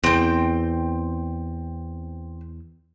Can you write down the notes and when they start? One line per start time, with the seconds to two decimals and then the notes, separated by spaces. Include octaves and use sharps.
0.04 E2 C4 G5